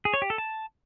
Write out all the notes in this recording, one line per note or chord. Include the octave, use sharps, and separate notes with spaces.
G#4
C#5
G4
A4
A5